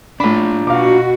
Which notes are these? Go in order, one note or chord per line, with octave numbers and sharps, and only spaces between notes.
A2 D4 F4 B5
B2 F#4 F5 A#5 D6